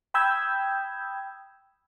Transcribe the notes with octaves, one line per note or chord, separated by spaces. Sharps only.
G5 B5 D#6 E6 G6 G#6